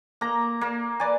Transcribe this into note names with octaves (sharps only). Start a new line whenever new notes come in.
A#3 A#5
A#3
B4 D5 G#5